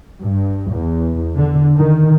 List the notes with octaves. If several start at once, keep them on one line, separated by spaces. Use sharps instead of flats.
G2
E2
D3
D#3